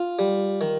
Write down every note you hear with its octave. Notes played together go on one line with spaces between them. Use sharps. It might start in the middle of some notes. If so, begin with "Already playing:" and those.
Already playing: F4
G3
D#3